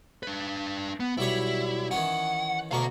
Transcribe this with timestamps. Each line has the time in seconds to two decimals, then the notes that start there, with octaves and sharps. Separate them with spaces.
0.23 D4 B4
1.00 B3
1.18 B1 G3 E4 C#5
1.91 D#3 E3 C#4 F#5
2.71 D2 B2 F5 A#5 C#6